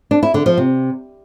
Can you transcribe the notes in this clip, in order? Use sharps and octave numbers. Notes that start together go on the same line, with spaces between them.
D4
E4
D3
F3
C3